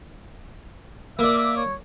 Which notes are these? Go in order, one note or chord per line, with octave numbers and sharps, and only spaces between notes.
A#3 D5 E5
E5
C#5